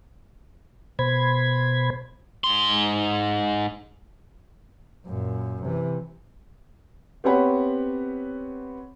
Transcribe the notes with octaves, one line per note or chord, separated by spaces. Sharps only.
B2 C5 B5 G#6
G#2 C6
F#2 A#2
C3 E3
B3 C4 G4 C#5 F#5 B5